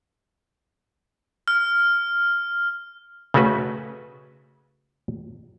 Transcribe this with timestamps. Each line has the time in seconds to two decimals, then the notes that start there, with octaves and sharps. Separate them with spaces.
1.48 F6
3.34 C#3 A3 C#4 F#4 B4